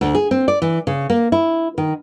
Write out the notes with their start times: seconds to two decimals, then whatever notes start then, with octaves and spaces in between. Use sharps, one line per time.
0.01 D2
0.15 G#4
0.31 C4
0.48 D5
0.62 E3
0.87 C#3
1.10 A#3
1.32 E4
1.78 D#3